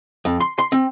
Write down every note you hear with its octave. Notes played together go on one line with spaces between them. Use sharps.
F2
C6
C6
C4